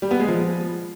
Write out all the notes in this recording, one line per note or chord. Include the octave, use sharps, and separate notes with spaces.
G3
B3
G#3
F3